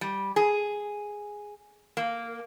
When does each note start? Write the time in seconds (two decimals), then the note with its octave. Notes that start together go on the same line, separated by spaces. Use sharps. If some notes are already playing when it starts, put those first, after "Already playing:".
0.01 G3
0.36 G#4
1.97 A#3